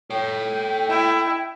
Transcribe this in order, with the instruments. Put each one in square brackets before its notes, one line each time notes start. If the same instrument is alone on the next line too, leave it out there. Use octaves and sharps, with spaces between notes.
[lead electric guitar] A4 C#5 [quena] G5
[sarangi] E4